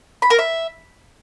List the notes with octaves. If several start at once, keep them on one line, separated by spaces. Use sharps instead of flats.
B5
A#4
E5